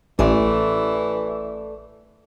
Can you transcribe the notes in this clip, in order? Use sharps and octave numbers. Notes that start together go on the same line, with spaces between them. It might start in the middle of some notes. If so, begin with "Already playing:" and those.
A1 E3 A3 A4 D5